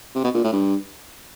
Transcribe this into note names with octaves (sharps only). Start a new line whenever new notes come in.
C3
B2
A#2
A2
G2